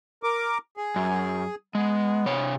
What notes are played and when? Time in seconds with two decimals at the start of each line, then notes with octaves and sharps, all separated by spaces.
0.23 A#4 D6
0.77 G#4
0.96 F#2
1.75 G#3 B3
2.26 C3 C#5